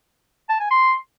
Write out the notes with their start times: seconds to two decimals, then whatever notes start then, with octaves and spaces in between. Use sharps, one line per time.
0.49 A5
0.60 G#5
0.71 C6